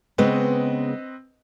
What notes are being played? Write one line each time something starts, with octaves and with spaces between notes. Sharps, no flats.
C#3 G#3 B3 C4 B4 D#5